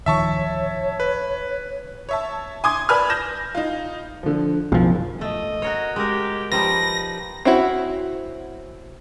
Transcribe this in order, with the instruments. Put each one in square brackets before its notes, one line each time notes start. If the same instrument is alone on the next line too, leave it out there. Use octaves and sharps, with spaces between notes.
[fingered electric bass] D1 D#3 F3 [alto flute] C#5 [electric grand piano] E5 A5 C#6
[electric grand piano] B4
[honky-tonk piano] C#5 E5 A5
G#5 C6 D6 D#6 G#6
B4 D5 G#5 A5 B5 F6
G6 A#6 E7
D#4 F4
[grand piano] D3 F3
[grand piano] F#1 [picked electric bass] B1 F3
[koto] A3 [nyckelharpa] D#5
[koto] F#4 A#4 C#5
[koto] G#3 A#4 [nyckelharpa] G4
[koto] F3 G3 D#4 [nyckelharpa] B4 [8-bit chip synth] A#6
[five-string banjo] C4 C#4 E4 F#4